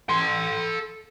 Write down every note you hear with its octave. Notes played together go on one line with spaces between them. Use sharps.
A4 C6